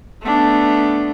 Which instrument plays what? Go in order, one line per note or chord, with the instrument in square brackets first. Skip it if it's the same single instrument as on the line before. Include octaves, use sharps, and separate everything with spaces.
[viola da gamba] A3 B3 D4